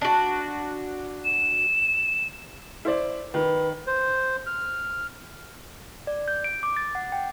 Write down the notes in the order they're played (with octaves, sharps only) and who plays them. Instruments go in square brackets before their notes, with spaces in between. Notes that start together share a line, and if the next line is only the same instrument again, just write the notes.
[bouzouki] D4 F#4
[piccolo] E7
[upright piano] E4 C5 D5
[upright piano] D#3 [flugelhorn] B4
[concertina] C5
F6
[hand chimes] D5
G6
D7
D6
A6
F#5
G5